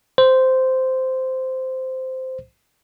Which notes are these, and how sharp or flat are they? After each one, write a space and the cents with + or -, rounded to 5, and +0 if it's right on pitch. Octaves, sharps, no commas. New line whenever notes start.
C5 -10